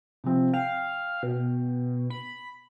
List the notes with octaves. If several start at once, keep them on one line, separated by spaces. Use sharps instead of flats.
C3 F3 C4
F5 G5
B2
B5